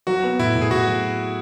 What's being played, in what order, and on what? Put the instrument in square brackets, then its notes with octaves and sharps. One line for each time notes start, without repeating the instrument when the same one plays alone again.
[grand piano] F#3 [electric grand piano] F#4
[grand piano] B3
[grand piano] A2 [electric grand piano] E4
[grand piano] A2
[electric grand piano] G#4
[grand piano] A2 [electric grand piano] F#4
[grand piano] F#3